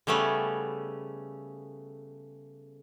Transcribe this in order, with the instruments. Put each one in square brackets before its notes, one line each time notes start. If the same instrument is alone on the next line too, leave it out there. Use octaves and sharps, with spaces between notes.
[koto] C#3 G3 A3 B3 C#4 A4